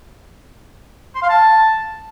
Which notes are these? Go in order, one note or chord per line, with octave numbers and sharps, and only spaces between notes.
C6
F5
A5